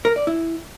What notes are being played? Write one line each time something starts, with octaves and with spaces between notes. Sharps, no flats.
A#4
D5
E4